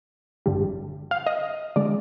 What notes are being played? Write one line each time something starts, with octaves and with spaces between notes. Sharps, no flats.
G#1 G2 D3 G3
F5
D#5
D3 G#3 D5